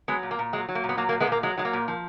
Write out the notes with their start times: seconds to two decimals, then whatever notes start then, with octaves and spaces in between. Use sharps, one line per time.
0.08 F#3 G#3 B3
0.23 A#2
0.31 A#3
0.39 A#2
0.53 F#3 G#3
0.69 F#3
0.75 A#3
0.84 A#2
0.89 B3
0.97 F#3 A#3
1.09 A#3
1.12 A#2
1.20 G#3 B3
1.27 A#2 A#3
1.43 F#3 G#3
1.58 F#3 G#3
1.65 A#3
1.73 A#2
1.88 F3